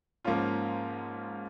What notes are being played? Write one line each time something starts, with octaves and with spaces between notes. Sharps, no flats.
G#2 F3 A#3 C#4 F4